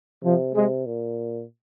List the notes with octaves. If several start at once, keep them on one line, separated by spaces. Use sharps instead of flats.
C3 F3
C3 G#3
A#2